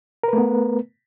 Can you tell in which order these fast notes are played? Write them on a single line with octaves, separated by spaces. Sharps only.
A#4 B4 A3 B3